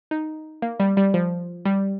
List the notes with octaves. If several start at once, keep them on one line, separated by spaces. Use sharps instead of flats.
D#4
A#3
G3
G3
F3
G3